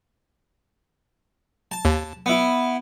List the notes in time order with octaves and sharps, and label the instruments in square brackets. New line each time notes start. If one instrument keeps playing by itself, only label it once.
[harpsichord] A5
[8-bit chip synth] D#2
[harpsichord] B3 E4